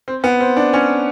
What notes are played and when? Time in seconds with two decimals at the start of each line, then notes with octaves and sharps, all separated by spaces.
0.08 C4
0.24 B3
0.40 C4
0.57 D4
0.73 C#4